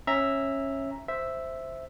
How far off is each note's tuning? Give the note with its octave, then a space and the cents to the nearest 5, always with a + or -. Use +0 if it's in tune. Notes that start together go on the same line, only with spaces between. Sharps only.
C#4 -20 E5 +0 A#5 +0
C5 +0 E5 +0